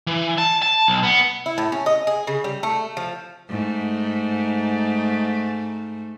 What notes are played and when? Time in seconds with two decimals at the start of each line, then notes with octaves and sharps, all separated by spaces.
0.07 E3
0.38 A5
0.62 A5
0.88 B1
1.03 B3
1.46 E4
1.58 A2
1.72 C#4
1.86 D#5
2.07 G#4
2.27 C#3
2.44 G3
2.63 A3
2.97 F3
3.49 G#2 A3